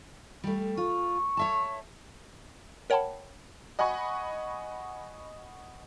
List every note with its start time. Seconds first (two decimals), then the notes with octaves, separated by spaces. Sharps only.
0.44 G3 A3
0.77 F4 C#6
1.37 C#5 E5 A5
2.90 A#4 C#5 F#5 G5 A5 B5
3.79 D#5 F#5 G#5 B5 C#6